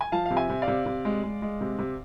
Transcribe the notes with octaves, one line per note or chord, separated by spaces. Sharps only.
G#5
F3 F5 A5
C3 F5
E5 G#5
C3
D5 F5
C3
C3
G#3
G#3
G#3
C3
C3